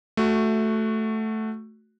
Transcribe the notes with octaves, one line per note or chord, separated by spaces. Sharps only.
A3 F#4